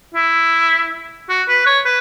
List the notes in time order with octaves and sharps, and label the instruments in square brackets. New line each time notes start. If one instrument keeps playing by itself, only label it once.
[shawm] E4
F#4
B4
C#5
B4